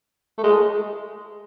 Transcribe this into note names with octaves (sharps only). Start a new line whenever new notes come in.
A3
G#3